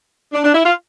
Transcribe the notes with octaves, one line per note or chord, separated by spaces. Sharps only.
D4
D4
E4
F4